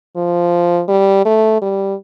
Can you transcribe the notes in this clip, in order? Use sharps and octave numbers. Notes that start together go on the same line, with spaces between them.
F3
G3
A3
G3